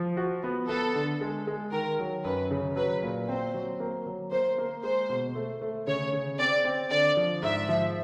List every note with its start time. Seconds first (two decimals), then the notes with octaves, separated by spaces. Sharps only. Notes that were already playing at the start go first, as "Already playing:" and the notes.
Already playing: F3
0.17 F#4
0.44 B3
0.69 B3 A4
0.95 D3
1.21 G#3
1.47 G#3
1.72 D#3 A#4
1.99 F#3
2.24 F#2 B4
2.51 C#3
2.76 F#3 B4
3.03 A#2
3.29 C4 C5
3.54 F#3
3.80 A#3
4.06 F#3
4.32 A#3 C5
4.58 A#3
4.83 G#3 C5
5.09 B2
5.35 A3
5.62 A3
5.87 C#3 C#5
6.13 C#3
6.39 C4 D5
6.65 C4
6.90 D3 D5
7.17 F3
7.43 G#2 E5
7.69 F3